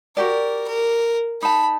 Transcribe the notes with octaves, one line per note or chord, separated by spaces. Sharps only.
F#4 G4 A#4 D5
A#4
D#4 A5 B5